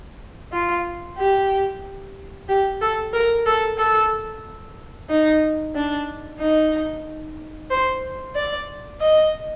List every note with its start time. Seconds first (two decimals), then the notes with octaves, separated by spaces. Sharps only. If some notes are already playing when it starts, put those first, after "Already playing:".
0.52 F4
1.18 G4
2.48 G4
2.81 A4
3.13 A#4
3.46 A4
3.78 A4
5.09 D#4
5.75 D4
6.40 D#4
7.70 C5
8.35 D5
9.01 D#5